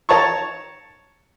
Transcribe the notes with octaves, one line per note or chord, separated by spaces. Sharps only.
C#5 A5 A#5 C#6